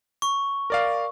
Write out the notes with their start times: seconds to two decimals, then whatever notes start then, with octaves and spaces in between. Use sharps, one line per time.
0.22 C#6
0.70 A#4 D5 F5